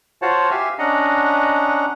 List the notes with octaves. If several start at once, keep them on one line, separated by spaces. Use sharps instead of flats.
F4 F#4 C5 C#5 F#5 A5
G4 E5 F5 G#5 E6
C#4 D4 D#5 F#5 A#5